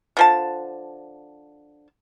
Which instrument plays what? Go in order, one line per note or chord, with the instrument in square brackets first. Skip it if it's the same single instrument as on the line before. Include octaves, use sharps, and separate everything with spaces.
[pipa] D3 F3 A5